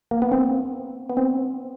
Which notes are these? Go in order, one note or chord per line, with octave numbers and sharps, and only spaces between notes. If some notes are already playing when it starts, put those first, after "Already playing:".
A#3
B3
C4
B3
C4